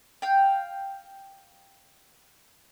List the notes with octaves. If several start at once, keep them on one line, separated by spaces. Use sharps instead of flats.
F5 G5